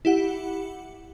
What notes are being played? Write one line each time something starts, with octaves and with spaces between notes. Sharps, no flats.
E4 G4 F#5